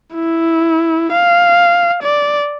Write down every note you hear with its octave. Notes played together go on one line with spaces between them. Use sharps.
E4
F5
D5